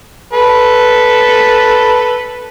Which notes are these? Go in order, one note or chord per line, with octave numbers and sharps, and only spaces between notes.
A4 B4